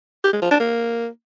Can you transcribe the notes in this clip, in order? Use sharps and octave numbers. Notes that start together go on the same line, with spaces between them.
G4
G#3
F3
D4
A#3